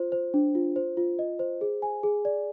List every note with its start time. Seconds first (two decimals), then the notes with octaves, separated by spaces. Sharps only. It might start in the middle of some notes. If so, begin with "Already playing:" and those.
Already playing: F4 C5
0.12 C5
0.34 D4
0.55 F4
0.76 C5
0.97 F4
1.19 D#5
1.39 C5
1.61 G#4
1.82 G#5
2.03 G#4
2.25 D5